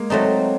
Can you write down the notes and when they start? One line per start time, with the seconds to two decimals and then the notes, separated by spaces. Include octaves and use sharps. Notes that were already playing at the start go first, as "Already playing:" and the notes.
Already playing: G#3 A#3
0.10 F#3 A3 C4 D#4